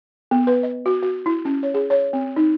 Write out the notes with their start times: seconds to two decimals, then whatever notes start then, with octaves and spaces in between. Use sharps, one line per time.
0.31 B3
0.47 B4
0.63 D#5
0.86 F#4
1.03 F#4
1.26 E4
1.45 C#4
1.63 C#5
1.74 G#4
1.90 C#5
2.13 C4
2.36 D#4